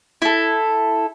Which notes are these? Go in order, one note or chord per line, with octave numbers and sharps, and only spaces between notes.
E4 A4